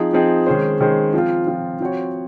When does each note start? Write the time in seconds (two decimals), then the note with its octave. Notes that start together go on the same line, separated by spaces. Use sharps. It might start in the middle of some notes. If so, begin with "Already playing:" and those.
Already playing: F3 C4 D#4 G#4
0.13 F3 C4 D#4 G#4
0.46 D#3 G#3 C#4 G#4 C5
0.80 D#3 G#3 C#4 G#4 C5
1.13 F3 C4 F4
1.47 F3 C4 F4
1.80 F3 C4 F#4 C#5